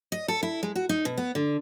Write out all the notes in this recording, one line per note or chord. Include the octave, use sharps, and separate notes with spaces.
D#5
A4
E4
G#3
F#4
D#4
B2
B3
D3